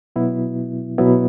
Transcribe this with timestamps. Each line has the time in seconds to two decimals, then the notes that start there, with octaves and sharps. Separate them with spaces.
0.16 B2 F#3 B3 E4
0.98 B2 F#3 B3 E4